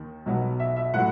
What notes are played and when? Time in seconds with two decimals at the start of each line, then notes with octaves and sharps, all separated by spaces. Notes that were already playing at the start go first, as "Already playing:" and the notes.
Already playing: D#2 D#3
0.26 B1 B2 F#3 B3
0.60 E5
0.76 E5
0.94 A2 F#3 F#5